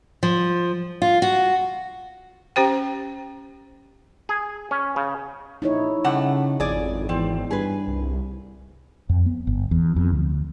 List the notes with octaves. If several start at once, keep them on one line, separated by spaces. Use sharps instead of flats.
F3
F4
F#4
C#4 G4 C5 G5
G#4
C#4
C#3
A#1 D#4 E4 C#5
C#3 G3 A3 F#5
G#1 F2 G#4 D5
E2 C4
G2 G#4 B4
C2
F2
B3
G1
E2
F2
D2